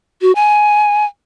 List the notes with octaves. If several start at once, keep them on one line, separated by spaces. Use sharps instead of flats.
F#4
G#5